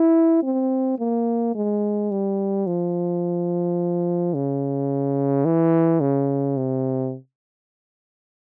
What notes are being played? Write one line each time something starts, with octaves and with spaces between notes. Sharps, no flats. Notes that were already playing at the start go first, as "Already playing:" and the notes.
Already playing: E4
C4
A#3
G#3
G3
F3
C#3
E3
C#3
C3